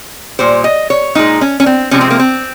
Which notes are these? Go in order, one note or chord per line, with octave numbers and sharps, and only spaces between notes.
A#2 G3 C5
D#5
C#5
A#2 G#3 D#4
C#4
C#4
C4
C3 F3 G#3 C#4
C4
A#3
C4